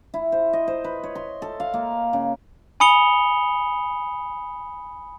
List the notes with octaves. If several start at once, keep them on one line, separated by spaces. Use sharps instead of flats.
E4
C5
D#5
C5
B4
C#5
C6
A4
F5
A#3
C#3
G#5 B5 D#6 C#7 F7 G7